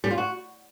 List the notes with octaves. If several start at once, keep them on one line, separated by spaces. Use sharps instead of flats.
G3
F4
F#4